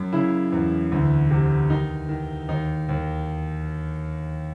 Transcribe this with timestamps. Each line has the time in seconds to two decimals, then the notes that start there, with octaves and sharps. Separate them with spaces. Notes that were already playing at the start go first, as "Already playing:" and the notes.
Already playing: F#2
0.13 C#3 E4
0.53 E2
0.92 D2
1.31 C3
1.70 D#3 D#4
2.09 D#3
2.49 D#2 D#4
2.89 D#2